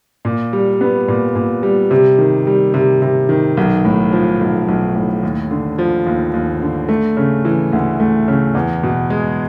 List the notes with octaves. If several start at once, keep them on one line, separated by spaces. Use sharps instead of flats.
A#2
G3
B3
A#2
A#2
G3
C3
D#3
G3
C3
C3
D#3
B1
A2
F3
B1
B1
A2
D#2
D3
F3
D#2
D#2
D3
A3
C#3
E3
D2
A3
C#3
E2
B2
G#3